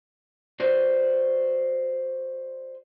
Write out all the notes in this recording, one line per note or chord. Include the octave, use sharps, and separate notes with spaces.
F#4 B4 C5 D5